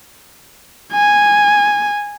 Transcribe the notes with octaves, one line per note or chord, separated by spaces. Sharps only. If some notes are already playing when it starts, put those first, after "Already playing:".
G#5